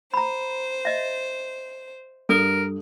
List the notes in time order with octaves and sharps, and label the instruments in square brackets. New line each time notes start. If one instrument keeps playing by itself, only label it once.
[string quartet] C5 [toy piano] A#5 B5
[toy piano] D#5 E5
[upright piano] G2 [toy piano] A4 D#6 [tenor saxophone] A#4